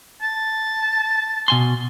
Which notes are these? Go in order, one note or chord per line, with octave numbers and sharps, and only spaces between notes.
A5
B2 G#5 C6